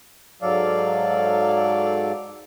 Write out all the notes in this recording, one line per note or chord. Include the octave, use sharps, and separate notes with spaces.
G#2 F#3 A4 D5 F5